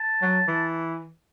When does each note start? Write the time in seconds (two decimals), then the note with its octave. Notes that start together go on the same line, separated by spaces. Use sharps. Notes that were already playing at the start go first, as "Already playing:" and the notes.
Already playing: A5
0.22 F#3
0.48 E3